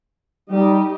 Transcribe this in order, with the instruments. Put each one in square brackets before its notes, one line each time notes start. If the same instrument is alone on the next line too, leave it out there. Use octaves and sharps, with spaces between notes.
[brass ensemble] G3 [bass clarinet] D#4 [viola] G4 D#5